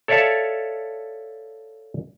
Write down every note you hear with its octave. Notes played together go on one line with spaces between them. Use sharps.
A4 C#5 D5 E5 F5 A5